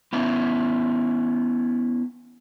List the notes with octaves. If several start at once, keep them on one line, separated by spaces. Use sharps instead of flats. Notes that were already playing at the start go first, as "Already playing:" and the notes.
B3 C#4 E4